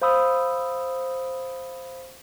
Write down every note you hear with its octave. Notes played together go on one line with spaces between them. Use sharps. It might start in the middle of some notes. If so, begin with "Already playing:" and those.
C5 F5 B5 D#6 E6